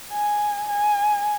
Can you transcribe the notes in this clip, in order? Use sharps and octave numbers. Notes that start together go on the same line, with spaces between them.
G#5
G#5